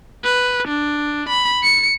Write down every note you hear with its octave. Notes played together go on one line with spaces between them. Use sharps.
B4
D4
B5
C#7